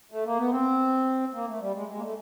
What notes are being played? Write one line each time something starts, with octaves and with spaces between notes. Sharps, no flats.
A3
A#3
B3
C4
A#3
A3
G3
G#3
G#3
A#3
A3